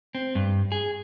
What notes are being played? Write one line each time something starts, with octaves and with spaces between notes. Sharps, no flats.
C4
G2
G#4